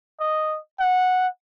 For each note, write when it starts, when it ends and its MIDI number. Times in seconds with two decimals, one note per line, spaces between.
0.20 0.58 75
0.80 1.27 78